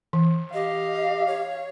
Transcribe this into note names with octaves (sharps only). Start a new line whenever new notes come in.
E3
G4 D#5 F5
C#5